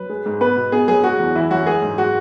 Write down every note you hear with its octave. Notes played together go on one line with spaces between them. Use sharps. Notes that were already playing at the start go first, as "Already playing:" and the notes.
Already playing: F#2 B4
G#3
G#2
B3 B4
B2
B3 G#4
F#2 G#4
G#3 F#4
E2
E3 E4
F#2 F#4
G#3 G#4
G#2
G#3 F#4